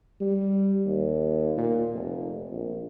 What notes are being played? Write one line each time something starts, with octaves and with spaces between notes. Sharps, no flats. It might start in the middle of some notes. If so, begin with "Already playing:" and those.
G3
D#2
A#2
F1
A#1